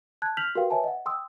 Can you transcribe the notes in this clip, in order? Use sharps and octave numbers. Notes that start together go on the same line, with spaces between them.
A5 F#6 G#6
F6 G6 B6 F7 F#7
F#4 G4 A#4 B4 F5 G5
B4 C#5 E5 G#5 A5
D#5 F#5
G5 C6 D#6 E6